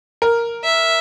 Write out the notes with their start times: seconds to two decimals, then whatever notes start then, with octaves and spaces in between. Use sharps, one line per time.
0.22 A#4
0.64 E5